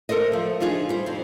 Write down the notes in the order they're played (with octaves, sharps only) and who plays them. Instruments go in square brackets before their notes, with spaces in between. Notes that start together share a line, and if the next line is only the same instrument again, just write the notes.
[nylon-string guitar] A4 A#4 C5 D#5
F3 A3
F3 D4 D#4 F4 G#4
G3 C5
F2 F3